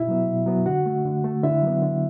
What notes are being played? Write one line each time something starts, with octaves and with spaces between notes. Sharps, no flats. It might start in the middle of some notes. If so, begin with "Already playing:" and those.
Already playing: B2 E4 E5
F#3 B3
B2
F#3 B3
D3 F#4 F#5
A3
D3
A3
D3 E4 E5
F#3 B3
D3